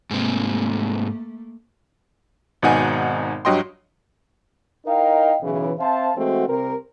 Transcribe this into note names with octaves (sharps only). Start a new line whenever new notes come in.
G#2 C3 A3 A#3
G#1 B2 D#4 F#5 G#5
G2 F#3 D#5 G5 C6
D#4 E4 A#4 D#5 F5 G5
B1 C#3 E3
C4 C5 E5 F5 A5
E3 G#3 A3 C4 F#4
C2 C3 C4 A#4